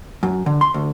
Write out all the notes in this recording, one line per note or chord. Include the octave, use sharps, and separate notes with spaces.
F#2
D3
C6
D2